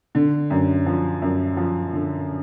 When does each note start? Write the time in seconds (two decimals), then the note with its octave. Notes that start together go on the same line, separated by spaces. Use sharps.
0.15 D3
0.50 F#2
0.86 F3
1.22 F#2
1.57 F3
1.93 D3